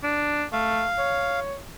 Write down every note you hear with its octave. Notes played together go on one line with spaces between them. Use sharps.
D4
A3 F5
C#5